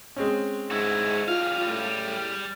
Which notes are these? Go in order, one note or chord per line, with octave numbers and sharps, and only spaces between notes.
G#3 C4 C#4
G#2 E4 F#4
G3 F4 F5
A2